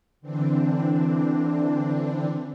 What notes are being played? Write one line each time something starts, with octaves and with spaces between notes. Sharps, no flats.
D3 E3 C4 D4